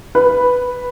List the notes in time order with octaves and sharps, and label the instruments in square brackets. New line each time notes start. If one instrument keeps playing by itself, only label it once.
[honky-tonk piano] B4